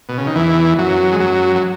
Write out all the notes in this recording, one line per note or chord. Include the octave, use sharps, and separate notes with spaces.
B2
C#3
D#3
E2 E3
F#2 F#3
G#3
F#2 F#3
F#3